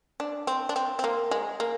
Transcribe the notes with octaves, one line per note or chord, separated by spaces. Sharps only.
D4
C4
D4
C4
C4
A#3
G#3
A#3